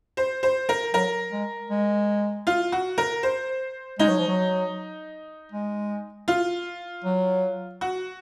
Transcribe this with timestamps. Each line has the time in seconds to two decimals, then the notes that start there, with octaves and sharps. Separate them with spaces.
0.17 C5
0.43 C5
0.69 A#4
0.94 F#3 A#4
1.32 G#3
1.70 G#3
2.47 F4
2.72 F#4
2.98 A#4
3.23 C5
3.99 G#3 D#4
4.09 F#3
4.19 F3
4.28 F#3
5.52 G#3
6.28 F4
7.04 F#3
7.81 F#4